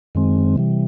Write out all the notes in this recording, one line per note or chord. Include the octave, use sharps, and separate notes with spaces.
F#2 D#3 G#3 C4
C3 E3 G3